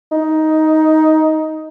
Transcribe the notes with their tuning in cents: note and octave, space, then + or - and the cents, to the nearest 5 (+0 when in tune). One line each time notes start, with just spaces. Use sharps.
D#4 +10